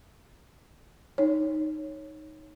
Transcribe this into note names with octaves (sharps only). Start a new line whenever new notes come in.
D#4 C#5